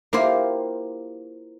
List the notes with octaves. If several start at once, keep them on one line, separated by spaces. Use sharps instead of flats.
A#3 E4 F4 G4 C5